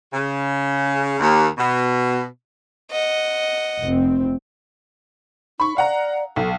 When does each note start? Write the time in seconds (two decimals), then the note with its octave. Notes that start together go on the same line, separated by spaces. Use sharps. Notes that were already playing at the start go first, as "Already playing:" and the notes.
0.14 C#3
1.19 D#2
1.58 B2
2.91 D#5 F#5
3.82 F1 C4
5.60 D#4 B5 C#6
5.77 D5 F5 F#5 A#5
6.36 B1 A4